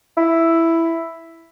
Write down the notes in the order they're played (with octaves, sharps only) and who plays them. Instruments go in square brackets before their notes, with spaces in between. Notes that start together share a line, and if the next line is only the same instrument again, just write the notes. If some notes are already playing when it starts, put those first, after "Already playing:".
[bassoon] E4